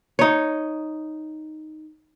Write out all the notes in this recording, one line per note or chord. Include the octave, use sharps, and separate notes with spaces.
D#4 C#5